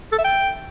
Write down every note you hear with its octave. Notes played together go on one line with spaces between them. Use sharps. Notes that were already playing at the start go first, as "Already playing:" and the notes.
A4
E5
G5